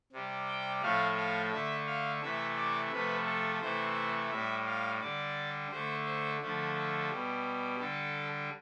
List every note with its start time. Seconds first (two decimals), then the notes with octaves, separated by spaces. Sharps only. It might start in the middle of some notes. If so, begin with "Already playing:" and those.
0.13 C3 G3
0.48 G5
0.82 A2 F3 A3 F5
1.17 F5
1.52 D3 A3 E5
1.87 F5
2.22 C3 E3 A3 E5
2.57 D5
2.92 C3 F3 A3 B4
3.26 A4
3.62 C3 E3 A3 C5
4.31 A2 G3 E5
4.66 F5
5.01 D3 G3 D5
5.71 D3 A3 C5
6.06 C5
6.41 D3 F3 A3
7.10 B2 G3
7.80 D3 G3 A4